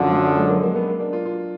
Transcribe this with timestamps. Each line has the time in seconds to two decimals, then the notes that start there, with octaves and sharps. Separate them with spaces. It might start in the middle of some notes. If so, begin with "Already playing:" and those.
Already playing: F#2 D3 F3 F#3
0.13 F#3
0.37 G#3
0.50 A#3
0.63 A#3
0.75 B3
0.87 A#3
1.00 D4
1.13 F4
1.25 F4